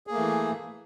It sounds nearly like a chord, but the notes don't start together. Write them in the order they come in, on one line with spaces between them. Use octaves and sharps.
G#4 A#3 A3 E3